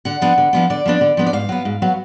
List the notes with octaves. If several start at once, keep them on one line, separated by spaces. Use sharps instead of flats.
D3 F#5
F3 B3 D4
D3
F3 B3 D4
D3 D5
F3 B3 D4
D3
F3 B3 D4
D5
G#2 F5
F#3 B3
G#2
F#3 B3